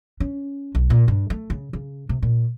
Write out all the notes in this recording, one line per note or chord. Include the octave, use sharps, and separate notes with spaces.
C#4
B1
A#2
G2
A3
C#3
C#3
C3
A#2